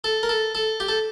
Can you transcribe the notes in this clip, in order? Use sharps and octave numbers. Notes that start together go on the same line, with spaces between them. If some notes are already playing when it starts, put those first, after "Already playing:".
A4
A#4
A4
A4
G4
A4